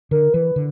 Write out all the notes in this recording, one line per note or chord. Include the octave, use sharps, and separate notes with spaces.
D3 A#4
E3 B4
D3